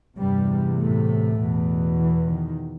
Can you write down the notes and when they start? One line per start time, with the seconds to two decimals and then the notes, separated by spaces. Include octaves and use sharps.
0.18 E2 G2 C3 G3
0.79 A2 A3
1.40 E2 B2
1.99 E3
2.30 D#3